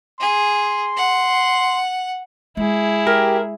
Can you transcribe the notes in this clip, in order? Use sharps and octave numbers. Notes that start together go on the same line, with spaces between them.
G#4 C6
F#5
G#3 E4 G#4
G4 A#4